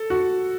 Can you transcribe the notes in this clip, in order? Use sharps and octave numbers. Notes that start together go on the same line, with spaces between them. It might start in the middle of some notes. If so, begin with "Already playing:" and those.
Already playing: A4
F#4